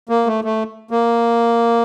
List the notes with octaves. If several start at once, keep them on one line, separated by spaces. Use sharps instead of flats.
A#3
A3
A3
A#3